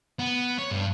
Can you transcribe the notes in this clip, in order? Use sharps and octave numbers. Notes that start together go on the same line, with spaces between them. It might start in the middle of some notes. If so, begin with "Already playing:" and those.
B3
C#5
G2